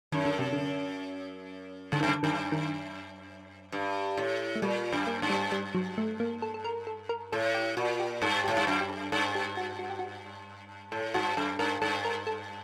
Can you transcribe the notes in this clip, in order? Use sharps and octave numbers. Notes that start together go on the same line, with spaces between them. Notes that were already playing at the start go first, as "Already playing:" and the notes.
F#2 D#3
D3
C3
D3
G2 D3
F#2 D#3
D3
F#2 D#3
D#3
G2
A2
A3
A#2 G3
F#2
A#3
G2
G3
G3
F#3
A3
A#3
A4
A4
A#4
A4
A#4
A2 A4
G4
A#2 F#4
G4
G2 A4
A2 G4
G2
F#2 F#4
G4
A4
G2 A4
G4
F#4
F#4
G4
F#4
A2 A4
G2 F#4
F#2 A4
G2 A#4
G2 A4
A#4
A4